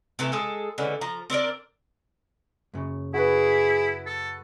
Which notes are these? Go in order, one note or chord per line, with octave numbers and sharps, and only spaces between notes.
C3 E3 A3
G#3 G#4 A4
D3 E3 G#3 C#4
F3 A#5
C4 D4 A#4 D5
F#2 C#3
E4 F#4 G#4 B4
A4